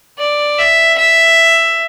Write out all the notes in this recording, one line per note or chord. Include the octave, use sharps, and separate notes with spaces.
D5
E5
E5